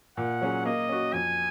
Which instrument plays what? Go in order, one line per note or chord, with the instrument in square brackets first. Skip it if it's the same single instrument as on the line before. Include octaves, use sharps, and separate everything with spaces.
[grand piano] A#2 [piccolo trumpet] F#5
[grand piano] F#3 C#4 G#4
[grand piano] A#3 [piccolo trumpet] D#5
[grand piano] C#4 F#4
[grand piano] F2 [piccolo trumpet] G#5